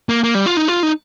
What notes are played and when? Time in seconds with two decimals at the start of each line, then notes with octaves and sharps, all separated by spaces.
0.09 A#3
0.24 A#3
0.35 G3
0.46 F4
0.57 D#4
0.68 F4
0.83 D#4